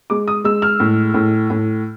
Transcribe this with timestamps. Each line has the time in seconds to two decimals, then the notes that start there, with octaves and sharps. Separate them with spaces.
0.10 G#3 D6
0.28 D#6
0.44 G#3 E6
0.62 F6
0.80 A2
1.14 A2
1.50 A2